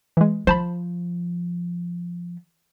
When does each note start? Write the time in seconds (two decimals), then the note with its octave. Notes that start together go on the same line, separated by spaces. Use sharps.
0.17 E3 G#3
0.47 F3 C5 A5 B5